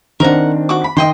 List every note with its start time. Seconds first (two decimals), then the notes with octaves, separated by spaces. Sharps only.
0.20 D#3 C4 D4 A#4 F#5
0.69 F#4 D6
0.84 B5
0.97 D#3 D#5 G5 C6